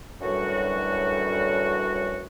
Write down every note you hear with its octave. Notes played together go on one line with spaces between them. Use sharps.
F#2 A2 D3 E3 G3 F#4